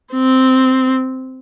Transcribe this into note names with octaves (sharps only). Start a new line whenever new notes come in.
C4